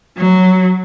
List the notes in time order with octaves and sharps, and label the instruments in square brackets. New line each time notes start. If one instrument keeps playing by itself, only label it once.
[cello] F#3